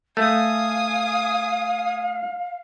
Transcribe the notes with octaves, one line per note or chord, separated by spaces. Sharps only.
A3 F5 G#5 D#6